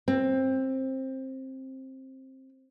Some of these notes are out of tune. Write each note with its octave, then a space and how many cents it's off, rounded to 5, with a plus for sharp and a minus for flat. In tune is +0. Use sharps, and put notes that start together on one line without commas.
C4 +15